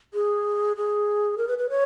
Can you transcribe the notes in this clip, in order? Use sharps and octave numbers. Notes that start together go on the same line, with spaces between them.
G#4
G#4
A#4
B4
B4
C#5